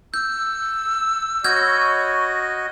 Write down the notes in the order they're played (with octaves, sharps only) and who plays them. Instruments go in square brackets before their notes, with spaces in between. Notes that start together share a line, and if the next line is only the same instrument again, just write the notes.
[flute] E6 [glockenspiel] G6
[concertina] F#4 D#5 [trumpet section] C#5 B5 C#6 [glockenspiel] F6 G6 G#6